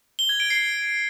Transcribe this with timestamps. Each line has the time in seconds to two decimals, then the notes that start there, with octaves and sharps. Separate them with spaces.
0.19 G7
0.29 G#6
0.40 D7
0.50 C7